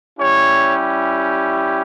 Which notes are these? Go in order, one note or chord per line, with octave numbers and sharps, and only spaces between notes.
G3 C#4 E4 G4 C#5